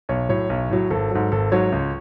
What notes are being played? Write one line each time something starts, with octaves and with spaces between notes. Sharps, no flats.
B1 C#5
A2 F#3 C#5
B1
A2 F#3
G#1 A4
G#2 F#3
G#1 A4
G#2 F#3 C#5
C#2